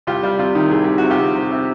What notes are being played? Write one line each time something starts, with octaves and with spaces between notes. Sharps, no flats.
C2 F4 G4
G3 F4
C3 F4
D#3 E4
C2 G#4
C3 G4
F#4
C3
F4 G4
C3
C3
C3